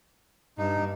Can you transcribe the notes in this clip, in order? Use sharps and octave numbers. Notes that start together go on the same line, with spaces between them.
G2 D#4